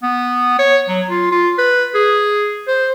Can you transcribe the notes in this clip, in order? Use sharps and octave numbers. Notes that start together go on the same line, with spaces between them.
B3
C#5
F#3
F4
F4
B4
G#4
C5